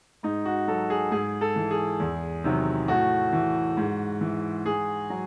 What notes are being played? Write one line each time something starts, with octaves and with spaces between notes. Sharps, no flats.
G#2 D#4
F#4
F#3 A4
G#4
G#2 G#4
A4
E3
G#4
E2
C3 D#3 F#3
A2 F#4
E3
G#2
E3
G#2 G#4
F#3